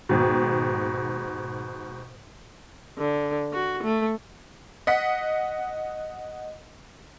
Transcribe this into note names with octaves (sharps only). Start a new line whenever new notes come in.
D#2 G#2 B2
D3
F#4
A3
D#5 F#5 B6